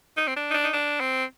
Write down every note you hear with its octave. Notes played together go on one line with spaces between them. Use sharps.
D#4
C4
D4
D#4
D4
D#4
D4
C4